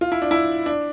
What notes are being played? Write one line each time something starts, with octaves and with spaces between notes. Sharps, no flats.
F4
E4
D4
E4
D4